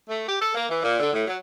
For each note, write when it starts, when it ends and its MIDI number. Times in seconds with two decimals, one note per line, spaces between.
0.09 0.23 57
0.27 0.35 67
0.40 0.52 69
0.55 0.65 58
0.68 0.80 52
0.83 0.99 46
0.99 1.10 50
1.13 1.26 45
1.26 1.35 54